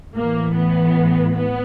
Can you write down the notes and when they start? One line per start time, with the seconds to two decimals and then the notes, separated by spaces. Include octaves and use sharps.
0.14 A2 E3 A#3
0.54 B3
1.34 B3